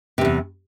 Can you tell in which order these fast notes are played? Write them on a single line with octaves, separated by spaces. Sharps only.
C3 G#2 E2